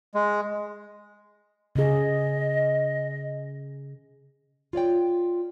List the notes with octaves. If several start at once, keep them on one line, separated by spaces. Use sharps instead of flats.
G#3
C#3 G#4 D#5
F4 C#5 D5 G5